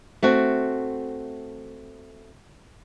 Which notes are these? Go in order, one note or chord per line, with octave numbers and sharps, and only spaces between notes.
A3 C4 F#4